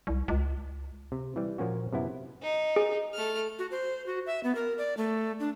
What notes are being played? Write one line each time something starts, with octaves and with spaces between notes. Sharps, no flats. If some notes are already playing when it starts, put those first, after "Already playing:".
C2
C#2
C3
E3 G3
A#2 F3 A#3 C#4 F#4
F#2 C3 B3 E4
D#4
G#4
A3 F6
F#4
C5
F#4
E5
B3
A#4
D5
A3
D4